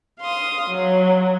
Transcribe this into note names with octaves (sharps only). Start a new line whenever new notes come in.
F5 C6 D#6
F#3